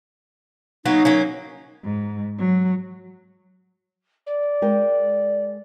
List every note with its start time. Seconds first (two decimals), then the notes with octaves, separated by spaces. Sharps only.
0.85 F#3 A#3 B3 D#4
1.05 F#3 A#3 C#4
1.84 G#2
2.38 F#3
4.26 D5
4.62 G#3 A#4 G5